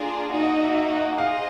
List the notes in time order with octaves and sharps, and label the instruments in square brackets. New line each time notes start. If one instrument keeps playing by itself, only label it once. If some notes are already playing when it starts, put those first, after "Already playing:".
Already playing: [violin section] A#3 D4 F4 G#4
[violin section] A#3 D#4 F#4 [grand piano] D#5
[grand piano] D#5
E5
E5
F#5
[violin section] D#4 G#4 C5 D#5 [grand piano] F5